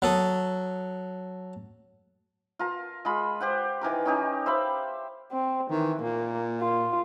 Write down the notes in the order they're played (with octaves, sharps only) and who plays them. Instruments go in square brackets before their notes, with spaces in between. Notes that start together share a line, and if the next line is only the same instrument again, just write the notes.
[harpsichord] F#3 A4 D#6
[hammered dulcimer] F4 A#4 A5
G#3 F4 B5
G4 C5 F#5
D#3 E3 A#4 D6
C#4 D#4 G4
C5 E5 F5 B5
[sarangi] C4
[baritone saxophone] D#3 [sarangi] E3
[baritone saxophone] A#2 [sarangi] A#3
[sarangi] F4